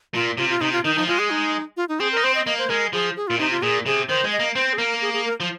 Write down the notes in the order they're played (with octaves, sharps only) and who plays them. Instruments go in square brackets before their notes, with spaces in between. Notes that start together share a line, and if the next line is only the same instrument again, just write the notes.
[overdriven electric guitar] A#2 [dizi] F4
[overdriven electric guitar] C3 [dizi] F4
[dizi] F4
[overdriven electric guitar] C3 [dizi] D#4
[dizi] F4
[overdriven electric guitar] D#3 [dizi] D#4
[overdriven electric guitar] F3 [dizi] D#4
[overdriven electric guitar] G#3 [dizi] F4
[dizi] G#4
D#4
F4
D#4
[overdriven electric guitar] C4 [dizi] G#4
[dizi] A#4
[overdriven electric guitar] D#4
[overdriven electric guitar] C4 [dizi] C5
[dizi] D#5
[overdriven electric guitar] A#3 [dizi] D#5
[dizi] C5
[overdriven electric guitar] G#3 [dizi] A#4
[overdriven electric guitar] F3 [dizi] G#4
[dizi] G#4
[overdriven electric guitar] A#2 [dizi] F4
[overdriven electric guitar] C3 [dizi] D#4
[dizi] F4
[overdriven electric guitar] A#2 [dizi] G#4
[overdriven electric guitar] C3 [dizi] G#4
[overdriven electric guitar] D#3 [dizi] C5
[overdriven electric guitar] G#3
[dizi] D#5
[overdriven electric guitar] A#3
[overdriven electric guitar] C4 [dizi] C5
[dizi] G#4
[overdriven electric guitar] A#3 [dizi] A#4
[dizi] G#4
G#4
A#4
[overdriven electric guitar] F3